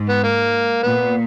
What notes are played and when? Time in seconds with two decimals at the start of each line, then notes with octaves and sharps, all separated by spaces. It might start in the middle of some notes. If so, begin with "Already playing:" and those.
Already playing: G#2
0.09 B3
0.23 A#3
0.83 A#2 B3